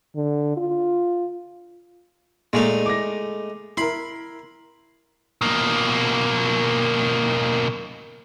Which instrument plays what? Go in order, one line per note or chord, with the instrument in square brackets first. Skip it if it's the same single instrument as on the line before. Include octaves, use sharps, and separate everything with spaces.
[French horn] D3
F4
[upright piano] A#2 [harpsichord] G#3 A3 D#4
[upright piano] D6 A#6
[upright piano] E4 A#4 [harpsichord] B5 C6
[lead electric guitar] B2 A#3